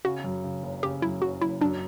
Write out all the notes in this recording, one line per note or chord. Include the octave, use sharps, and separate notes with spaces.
C#3 F#4
F#2
C#3
F#1
C#3 G4
F#2 E4
F#1 F#4
F#1 E4
F#2 D4